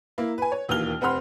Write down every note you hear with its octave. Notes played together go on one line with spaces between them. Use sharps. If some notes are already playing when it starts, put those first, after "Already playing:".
A#3 E4
B4 G#5
C#5
E1 D#2 E3 A#3 F6 G7
F1 C4 F#5 B5 C6 F6